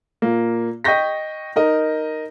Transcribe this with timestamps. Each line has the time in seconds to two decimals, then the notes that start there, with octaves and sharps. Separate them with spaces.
0.22 A#2 A#3
0.84 D#5 G5 C#6 G6 A#6 B6
1.56 D#4 A#4 D#5